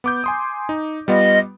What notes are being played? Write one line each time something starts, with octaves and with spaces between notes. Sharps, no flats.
B3 D6 G6
G#5 C6 D#6
D#4
G3 B3 F4 D#5